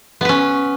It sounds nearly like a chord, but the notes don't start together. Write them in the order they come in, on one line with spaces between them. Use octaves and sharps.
B3 B4 C#4